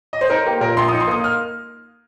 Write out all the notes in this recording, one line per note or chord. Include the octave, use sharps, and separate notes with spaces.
D#5
C5
D#4 A#4
A#3 G4
A#2 A#4
A#1 C6
D#6
D#4
C6
A#3 D#6
F6